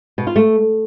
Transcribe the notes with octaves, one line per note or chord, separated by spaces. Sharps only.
B2
F4
A3